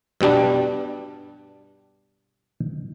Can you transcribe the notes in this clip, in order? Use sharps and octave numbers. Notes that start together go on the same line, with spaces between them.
G2 B2 G3 D4